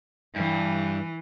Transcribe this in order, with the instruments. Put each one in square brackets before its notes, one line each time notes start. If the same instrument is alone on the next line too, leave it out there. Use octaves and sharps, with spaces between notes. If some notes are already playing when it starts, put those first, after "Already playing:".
[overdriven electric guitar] G2 [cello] E3